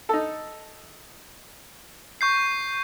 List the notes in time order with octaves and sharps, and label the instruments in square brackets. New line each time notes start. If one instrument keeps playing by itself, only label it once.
[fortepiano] D#4 A4
[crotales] C#6 G6 C7